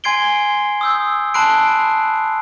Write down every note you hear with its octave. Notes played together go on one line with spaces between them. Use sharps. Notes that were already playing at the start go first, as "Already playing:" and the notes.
G#5 C6 G#6 C7 D7 G7
D#6 E6 G6
A5 B5 C6 F#6 C7 D7